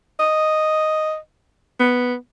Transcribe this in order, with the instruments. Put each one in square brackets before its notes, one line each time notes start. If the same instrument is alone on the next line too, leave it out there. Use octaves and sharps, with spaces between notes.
[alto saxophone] D#5
B3